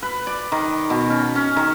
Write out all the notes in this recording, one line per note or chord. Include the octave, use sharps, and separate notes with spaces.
B4
D5
D#3
B2
C#4
C#4
D#3